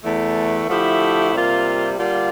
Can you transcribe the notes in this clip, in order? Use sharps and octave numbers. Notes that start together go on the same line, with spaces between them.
E2 E3 A3
D3 F3 A3 E4 G4
C3 G3 A#3 F4
D3 G3 A#3 F4